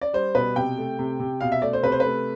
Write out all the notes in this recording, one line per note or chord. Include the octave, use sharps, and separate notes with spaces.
D5
G3 C5
B2 B4
C3 G5
A3
C3
C3
B2 F5
E5
A3 D5
C5
C3 B4
C5
B4
A3